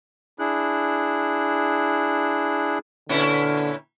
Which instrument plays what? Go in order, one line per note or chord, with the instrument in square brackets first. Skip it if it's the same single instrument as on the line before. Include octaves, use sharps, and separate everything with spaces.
[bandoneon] D4 E4 G#4 F#6
[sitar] A#2 C#4 E4 [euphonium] D3